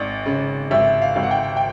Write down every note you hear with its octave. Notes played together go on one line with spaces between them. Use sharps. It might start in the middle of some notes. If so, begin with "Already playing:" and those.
Already playing: G#1 D5
C#3
G#1 E5
F5
G#1 F5
F#5
G5
G5